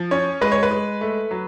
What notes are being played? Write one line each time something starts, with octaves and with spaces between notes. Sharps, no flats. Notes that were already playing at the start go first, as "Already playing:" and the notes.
Already playing: F3
C#4 C#5
G#3 B4
C#5
B4
G#3
A3
F#3